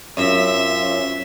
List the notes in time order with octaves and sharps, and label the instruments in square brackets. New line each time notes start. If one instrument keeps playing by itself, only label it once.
[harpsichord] F#2 [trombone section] C4 C#4 F4 [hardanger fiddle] E5